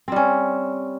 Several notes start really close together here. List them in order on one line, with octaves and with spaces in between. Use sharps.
C4 G3 C#4